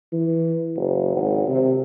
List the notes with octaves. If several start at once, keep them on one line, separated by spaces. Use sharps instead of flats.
E3
F#1
G#1
C3